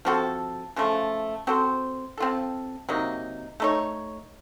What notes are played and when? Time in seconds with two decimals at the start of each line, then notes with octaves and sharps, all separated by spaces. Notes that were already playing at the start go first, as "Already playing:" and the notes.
0.05 F3 C4 F#4 A4
0.76 C#3 F3 A3
1.47 C4 F#4 A4 C5
2.18 C4 F4 A4
2.89 C3 F#3 A#3 D#4
3.60 A3 D#4 A4 C#5